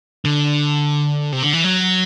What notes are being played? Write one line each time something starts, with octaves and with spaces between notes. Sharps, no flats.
D3
C3
D3
E3
F#3